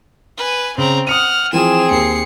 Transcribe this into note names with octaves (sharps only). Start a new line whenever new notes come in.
B4 G#5
C#3 C4 A#5
F#5 D#6 F6 C#7 D#7
E3 F3 C4 G#4 G#5 E7
D#2 C7 C#7